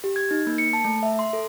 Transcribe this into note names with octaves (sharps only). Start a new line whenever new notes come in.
G4
G#6
D#4
A#3
C#7
A5
A3
E5
C6
A4